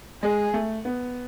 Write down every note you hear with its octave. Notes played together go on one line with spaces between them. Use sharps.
G#3 G#4
A3
B3